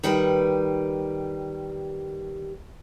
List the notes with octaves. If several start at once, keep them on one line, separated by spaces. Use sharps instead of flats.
D#3 G3 G4 B4